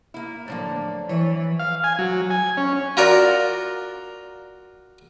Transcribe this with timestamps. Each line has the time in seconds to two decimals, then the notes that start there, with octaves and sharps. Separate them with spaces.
0.14 A#3 E4
0.48 A2 D3 F3 F#3 A#3 D5
1.09 E3 C#5
1.60 F5
1.84 G#5
1.99 F#3
2.30 G#5
2.57 C#4
2.97 F4 F#4 A#4 D5